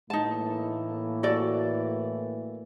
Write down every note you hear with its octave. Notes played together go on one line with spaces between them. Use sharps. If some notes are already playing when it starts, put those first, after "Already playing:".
A2 E3 A#3 D#4 A5
F#4 A4 D5